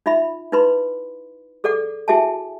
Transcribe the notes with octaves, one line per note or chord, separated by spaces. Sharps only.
D#4 F4 E5 B5
D#4 E4 B4 B5 C6
G#4 A4 D5 F#5 D6
E4 F#4 G#4 E5 G#5 A5